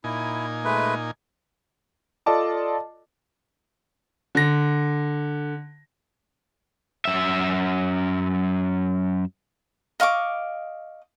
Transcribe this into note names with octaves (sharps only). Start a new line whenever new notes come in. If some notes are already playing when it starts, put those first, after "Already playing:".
A#2 D#4 E4 G#5
G#3 A3 B4
F4 A4 D5 D#5 A5 D6
D3 A#6
F#2 E5
D#5 F5 C#6 D6